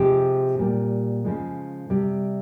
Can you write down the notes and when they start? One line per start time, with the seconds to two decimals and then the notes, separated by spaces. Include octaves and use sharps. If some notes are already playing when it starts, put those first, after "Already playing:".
Already playing: C3 F3 G#3 G4
0.59 A#2 G3
1.24 C#3 F3 G#3
1.90 C3 G3